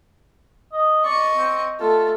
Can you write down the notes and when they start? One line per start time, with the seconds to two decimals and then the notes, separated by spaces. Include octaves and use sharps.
0.73 D#5
1.05 D5 D#5 C#6
1.37 C4
1.80 A3 F4 A4